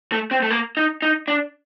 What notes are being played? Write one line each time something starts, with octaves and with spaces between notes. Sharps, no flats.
A3
C4
A3
A#3
D#4
D#4
D4